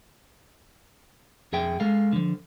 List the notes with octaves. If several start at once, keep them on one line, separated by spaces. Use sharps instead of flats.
F2 G#4 E5 G5
G#3 A4 F5
D3 F3